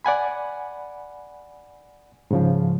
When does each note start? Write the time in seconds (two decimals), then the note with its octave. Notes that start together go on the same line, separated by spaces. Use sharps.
0.05 D5 F#5 G#5 B5
2.31 G#2 C#3 F3